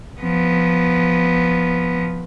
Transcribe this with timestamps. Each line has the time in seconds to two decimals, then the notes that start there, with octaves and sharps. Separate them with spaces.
0.21 F3 B3